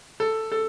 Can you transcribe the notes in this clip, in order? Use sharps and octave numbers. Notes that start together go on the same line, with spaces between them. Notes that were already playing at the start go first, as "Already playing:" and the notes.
A4
A4